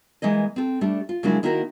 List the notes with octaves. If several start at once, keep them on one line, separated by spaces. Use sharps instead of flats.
E3 G#3 A#3 D#5
C4 A4
G3 A3 D4
F4
C#3 F#3 G#3 A#3 D4 E4
D#3 A#3 E4 F#4 A4 A#4